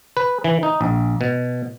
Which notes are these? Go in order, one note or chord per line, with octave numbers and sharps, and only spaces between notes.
B4
E3
D#4
A#1
B2